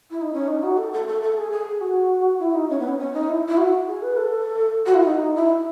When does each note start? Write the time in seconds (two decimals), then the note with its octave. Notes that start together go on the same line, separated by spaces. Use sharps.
0.11 E4
0.21 D#4
0.33 C#4
0.48 D#4
0.63 F#4
0.78 A4
0.93 A4
1.07 A4
1.22 A4
1.37 G#4
1.52 G#4
1.81 F#4
2.40 E4
2.54 D#4
2.70 C#4
2.79 B3
2.88 C#4
2.99 C#4
3.13 D#4
3.29 E4
3.48 E4
3.57 F#4
3.87 G#4
4.02 B4
4.17 A4
4.86 F#4
4.95 E4
5.05 D#4
5.35 E4